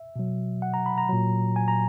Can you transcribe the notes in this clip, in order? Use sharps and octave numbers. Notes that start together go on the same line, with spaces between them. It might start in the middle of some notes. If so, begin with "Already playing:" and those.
Already playing: E5
B2 F#3
F#5
A#5
B5
A#5
A#2 F#3
G#5
A#5